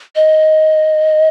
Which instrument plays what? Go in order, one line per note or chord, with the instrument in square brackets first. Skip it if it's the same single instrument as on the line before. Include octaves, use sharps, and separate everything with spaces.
[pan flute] D#5